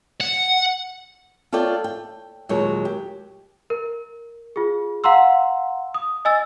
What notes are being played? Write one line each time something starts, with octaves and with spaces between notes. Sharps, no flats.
F#5
F4 A4 C#5 D5 G5
G5
D#2 A#2 F#3 G#3 G#4 C#5
G4
A#4
F4 G#4
F5 F#5 A#5 C6 E6
D#6
D#5 G#5 E6 A6